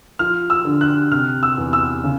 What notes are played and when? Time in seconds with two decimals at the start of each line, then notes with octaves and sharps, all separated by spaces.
0.19 F3 F6
0.50 E6
0.65 D3
0.81 F#6
1.11 C3 F6
1.43 E6
1.58 E2
1.73 E6
2.04 C#3